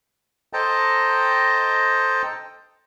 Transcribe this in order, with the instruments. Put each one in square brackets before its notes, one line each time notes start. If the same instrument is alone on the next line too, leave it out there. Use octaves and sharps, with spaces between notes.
[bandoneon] A4 C5 D#5 G5 A5 A#5